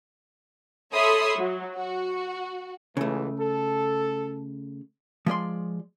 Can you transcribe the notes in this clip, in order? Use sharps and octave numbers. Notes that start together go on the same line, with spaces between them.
A4 C#5 E5 B5 C6 D#6
F#3
F#4
C#2 C#3 E3 A3
A4
F3 G#3 D5 C6